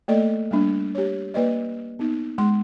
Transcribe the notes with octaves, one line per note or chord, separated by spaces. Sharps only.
A3 A#3 A4 D5 D#5
G3 A#3 D4
G4 C#5
A#3 B4 D5 D#5
B3 D#4
G#3 C6